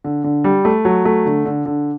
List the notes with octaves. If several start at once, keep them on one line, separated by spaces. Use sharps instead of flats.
D3
D3
G3
A3
F#3
A3
D3
D3
D3